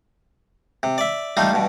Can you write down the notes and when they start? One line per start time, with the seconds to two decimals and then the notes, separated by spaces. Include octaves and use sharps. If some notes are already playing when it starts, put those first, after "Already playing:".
0.83 C3
0.98 D5 E5
1.37 G3 A3 D#4 F4
1.53 G2 B2